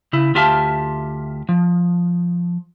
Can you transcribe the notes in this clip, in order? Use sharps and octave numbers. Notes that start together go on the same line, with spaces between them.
C#3 E4
D2 F4 G4 E5 F5 A5
F3